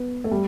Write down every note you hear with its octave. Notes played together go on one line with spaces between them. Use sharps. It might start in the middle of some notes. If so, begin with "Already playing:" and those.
Already playing: B3
A3
G3